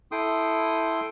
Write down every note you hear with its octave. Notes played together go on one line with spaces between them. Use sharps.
E4 A4 G5 C6 D#6